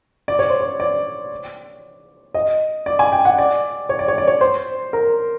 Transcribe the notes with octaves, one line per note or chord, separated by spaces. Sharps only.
D5
C#5
C5
C#5
D5
D#5
D5
G#5
G5
F#5
D5
C#5
D5
C#5
D5
C#5
C5
A#4